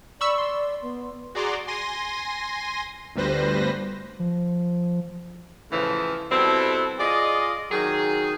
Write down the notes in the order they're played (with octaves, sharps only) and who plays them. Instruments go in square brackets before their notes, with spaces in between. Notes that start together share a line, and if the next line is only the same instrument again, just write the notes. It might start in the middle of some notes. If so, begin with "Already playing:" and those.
[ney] D5 [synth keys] B5 C#6 E6
[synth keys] C6
[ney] B3
[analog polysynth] F#4 G#4 D5 A#5 C6 D6
G#5 C6 A#6 D#7
G1 D2 G3 B4 C5 A#6
[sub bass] F3
[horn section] A2 C#3 E3 F3
B2 G3 C4 E4 A4
F4 G#4 D5 D#5
D#3 F#3 G#4